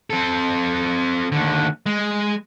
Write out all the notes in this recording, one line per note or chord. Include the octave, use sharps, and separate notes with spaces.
C4 A4
D#2 D3
G#3